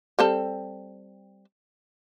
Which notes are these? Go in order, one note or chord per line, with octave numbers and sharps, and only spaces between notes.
G3 C4 A4